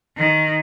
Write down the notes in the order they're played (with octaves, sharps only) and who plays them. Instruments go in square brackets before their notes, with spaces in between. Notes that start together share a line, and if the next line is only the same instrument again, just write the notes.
[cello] D#3